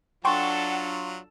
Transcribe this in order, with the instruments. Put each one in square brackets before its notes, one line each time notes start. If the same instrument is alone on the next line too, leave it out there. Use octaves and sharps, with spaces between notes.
[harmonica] F#3 F4 [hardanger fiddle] D4 A4 [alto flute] F#5 [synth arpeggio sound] G5 C6 C#6